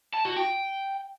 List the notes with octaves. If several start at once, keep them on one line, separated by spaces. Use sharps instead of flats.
A5
F#4
G5